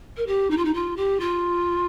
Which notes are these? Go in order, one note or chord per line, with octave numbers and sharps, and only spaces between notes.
A#4
G4
D#4
F4
D#4
F4
G4
F4